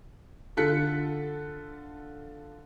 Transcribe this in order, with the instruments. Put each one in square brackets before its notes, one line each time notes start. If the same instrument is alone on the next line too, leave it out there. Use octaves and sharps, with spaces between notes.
[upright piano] D3 F4 A4 F#6 B6 C#7